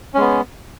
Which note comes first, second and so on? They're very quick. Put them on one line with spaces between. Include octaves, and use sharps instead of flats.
C#4 G#3 B3